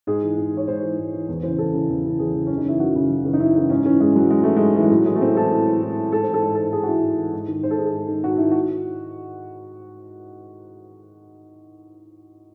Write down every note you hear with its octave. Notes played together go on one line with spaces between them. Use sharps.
G#2 G#4
E3
G#2
E3 C#5
G#2 C5
E3
G#2
E3
E2
C#3 E3 C5
E2 A4
C#3 E3
E2
C#3 E3
E2 G#4
C#3 E3
F#2 C#4
D#4
C#3 E3 E4
F#2 F#4
C#3 E3
F#2
C#3 E3
D#4
F#2 E4
C#3 E3 D#4
G#2 C#4
E3 C#4
G#2 G#3
E3 F#3
G#2 G#3
E3 A3
G#2 G#3
E3 A3
G#3
A2 F#3
E3 G#3
A3
A2 C4
E3 A4
A2
E3
A2
E3
G#2 A4
E3 C5
A4
G#2 C5
E3 A4
G#2 G#4
F#4
E3 E4
G#2
E3
G#2
D#3
G#2 C5
A4
D#3 G#4
A4
G#2
D#3
G#2 F#4
D#3 E4
F#4